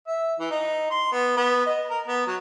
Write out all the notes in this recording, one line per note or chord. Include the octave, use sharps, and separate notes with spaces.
E5
E3
D#4
C6
B3
B3
D#5
A#4
B3
F#3